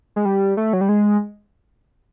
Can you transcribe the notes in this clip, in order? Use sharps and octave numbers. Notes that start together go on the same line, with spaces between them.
G#3
G3
A3
F#3
G3
G#3